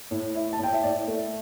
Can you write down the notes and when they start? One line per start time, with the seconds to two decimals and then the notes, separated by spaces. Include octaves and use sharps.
0.11 A2
0.35 E4
0.53 A5
0.59 A2 G5
0.73 E5
0.83 A2 D5
1.07 A3